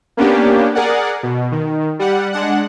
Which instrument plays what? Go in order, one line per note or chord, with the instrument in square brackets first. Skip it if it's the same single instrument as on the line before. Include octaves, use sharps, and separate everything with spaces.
[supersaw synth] A#3 B3 C#4 D4 G4
G#4 A#4 D5 F#5
B2
D#3
G3 F#5
G#3 D4 F#5